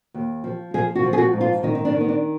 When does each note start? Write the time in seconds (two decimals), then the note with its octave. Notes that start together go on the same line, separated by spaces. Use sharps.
0.14 D#2
0.44 F3
0.74 F3 G#4
0.95 F#4
1.03 F3
1.13 G#4
1.18 F#4
1.33 G#2
1.41 F4
1.63 D#3 D#4
1.75 D#4
1.85 D4
1.92 D#3
2.01 B3
2.08 D4